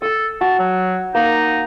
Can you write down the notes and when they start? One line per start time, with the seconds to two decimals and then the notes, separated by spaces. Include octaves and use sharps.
0.02 A4 D#6 E6
0.41 F#4 A5
0.59 F#3
1.15 A#3 D#4